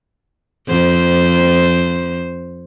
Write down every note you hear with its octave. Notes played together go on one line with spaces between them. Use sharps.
F2 C5